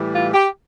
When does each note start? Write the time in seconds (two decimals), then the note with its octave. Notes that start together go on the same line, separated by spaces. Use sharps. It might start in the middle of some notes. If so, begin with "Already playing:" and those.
Already playing: A2 E3 G3
0.13 F4
0.33 G4